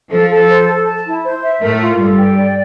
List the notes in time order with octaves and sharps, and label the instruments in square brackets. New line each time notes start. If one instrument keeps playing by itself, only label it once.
[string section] F3 [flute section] A4
[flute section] A4
C5
A4
A5
E4
C5
E5
[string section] A2 A3 [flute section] A#4
[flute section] F4
[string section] G2 G3 [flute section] A4
[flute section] G5
D5